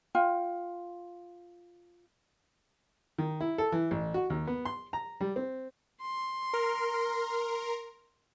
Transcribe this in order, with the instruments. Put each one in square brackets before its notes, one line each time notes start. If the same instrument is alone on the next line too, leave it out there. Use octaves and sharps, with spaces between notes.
[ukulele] F4 G5
[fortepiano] D#3
E4
A4
E3
A1
F#4
D#2
B3
C6
A#5
G3
C4
[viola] C6
[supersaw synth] A#4